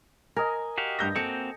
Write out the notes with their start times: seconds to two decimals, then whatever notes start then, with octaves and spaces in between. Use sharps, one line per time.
0.36 A#4 D#5 G#5
0.78 F#4 G4 F5
0.99 G2 G6 A#6
1.16 A#3 C4 F#4 A4 C#7